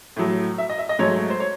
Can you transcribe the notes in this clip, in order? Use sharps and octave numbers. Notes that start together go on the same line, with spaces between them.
A2 F#3 A3
E5
D#5
E5
D#5
G#2 F#3 A3 C#5
C5
C#5